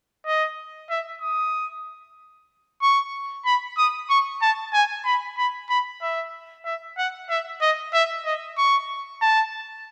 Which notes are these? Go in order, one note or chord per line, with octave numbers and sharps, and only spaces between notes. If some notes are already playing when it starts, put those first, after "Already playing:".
D#5
E5
D#6
C#6
B5
D#6
C#6
A5
G#5
B5
B5
B5
E5
E5
F#5
E5
D#5
E5
D#5
C#6
A5